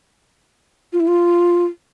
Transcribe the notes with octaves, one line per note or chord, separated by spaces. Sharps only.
F4
E4
F4